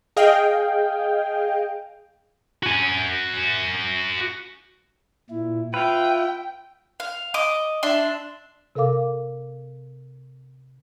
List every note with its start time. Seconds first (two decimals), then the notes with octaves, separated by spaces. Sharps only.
0.17 G#4 D#5 F5 G5
2.63 F#4 G#5
5.30 A#2 E4
5.74 F4 B4 E5 F5 G5
7.00 F5
7.34 D#5 D6
7.83 D4 E5 C6
8.75 C3 A4 A#4 F5 D6